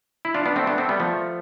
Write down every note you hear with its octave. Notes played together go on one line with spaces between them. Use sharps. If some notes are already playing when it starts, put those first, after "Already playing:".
E4
D4 F4
B3 D4
A3 C4
B3 D4
A3 C4
G3 B3
F3 A3